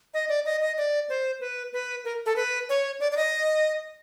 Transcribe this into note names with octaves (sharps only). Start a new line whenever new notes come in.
D#5
D5
D#5
D#5
D5
C5
B4
B4
A#4
A4
B4
C#5
D5
D5
D#5